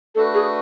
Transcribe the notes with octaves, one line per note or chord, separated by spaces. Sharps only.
A3 D4 F#4 A4 B4
G#4